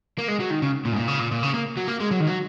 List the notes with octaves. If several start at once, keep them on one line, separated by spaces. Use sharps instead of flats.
A#3
G#3
F#3
D#3
C#3
A#2
G#2
A#2
C#3
A#2
A#2
C#3
A#3
F#3
A#3
G#3
F#3
D#3
F#3